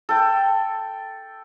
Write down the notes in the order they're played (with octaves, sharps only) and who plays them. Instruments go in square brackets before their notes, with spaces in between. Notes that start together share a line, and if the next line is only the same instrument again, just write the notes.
[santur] A4 G5